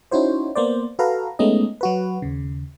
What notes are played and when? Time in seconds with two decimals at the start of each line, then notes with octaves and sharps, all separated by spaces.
0.11 C#4 D#4 E4 F#4 C5 C#5
0.56 A#3 B3 C5 D5
0.99 F#4 A4 B4 F5 A#5
1.39 G#3 A3 B3 C#4 D#4 D#5
1.81 F#3 F#4 B4
2.22 D#2 C#3